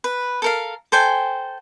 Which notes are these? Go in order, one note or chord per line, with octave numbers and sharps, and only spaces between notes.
B4
A4 A#4 F5
A4 C5 G5 G#5